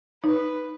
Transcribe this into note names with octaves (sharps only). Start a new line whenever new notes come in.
D#4 B4